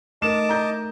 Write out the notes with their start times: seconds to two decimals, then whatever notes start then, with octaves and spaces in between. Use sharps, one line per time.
0.22 A3 D#4 A#4 D#5 A5 D6 E7
0.49 A#5 G6